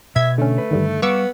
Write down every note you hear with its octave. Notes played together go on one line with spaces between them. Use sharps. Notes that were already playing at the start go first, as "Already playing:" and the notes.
B2 E5 G#6
D3 A3 C#4
B4
G2 D3 D#3
G3 B3 F5 C#6 D6 E6